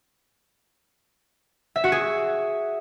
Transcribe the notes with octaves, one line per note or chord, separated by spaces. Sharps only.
E5
F#4
G#4